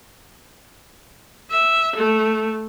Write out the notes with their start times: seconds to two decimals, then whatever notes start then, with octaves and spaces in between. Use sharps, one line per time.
1.50 E5
1.96 A3